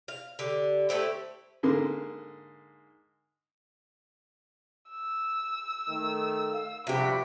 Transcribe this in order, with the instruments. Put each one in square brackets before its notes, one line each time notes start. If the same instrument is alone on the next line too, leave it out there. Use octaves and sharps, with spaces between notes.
[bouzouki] F5
D3 G4
A3 E4 G4 C5
[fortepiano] G#2 D3 A#3 C6
[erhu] E6
[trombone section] D#3 A3
[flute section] F5
[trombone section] A#1 G2 [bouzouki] C3 G4 [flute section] F#4 C5 E5 [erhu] B5